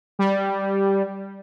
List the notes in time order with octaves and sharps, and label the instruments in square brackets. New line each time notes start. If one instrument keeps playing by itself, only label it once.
[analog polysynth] G3